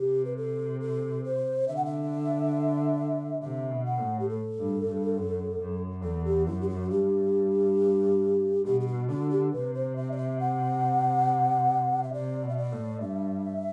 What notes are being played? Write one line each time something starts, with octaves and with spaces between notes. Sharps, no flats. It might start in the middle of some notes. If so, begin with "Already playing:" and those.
Already playing: C3 G4
B4
A4
A4
C5
D3 E5
F#5
E5
C3 E5
B2
F#5
A2
G4
A4
G2
G2
F#2
F#2
E2 A4
G4
F#2 E4
G4
F#4
G2 G4
B2 G4
G4
F#4
D3 F#4
G4
C3 B4
C5
E5
D5
E5
F#5
E5
C3 D5
B2
E5
D5
A2
G2 E5